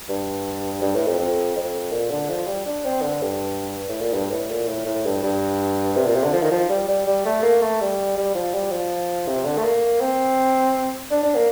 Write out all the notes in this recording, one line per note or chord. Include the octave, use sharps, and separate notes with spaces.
G2
G2
A2
F2
F2
F2
A#2
D3
F3
G3
D4
C4
D3
G2
A2
A#2
G2
A2
A#2
A2
A2
G2
G2
C3
A#2
C3
D3
F3
D#3
F3
G3
G3
G3
A3
A#3
A3
G3
G3
F3
G3
F3
C3
D3
A3
A#3
C4
D4
D4
A#3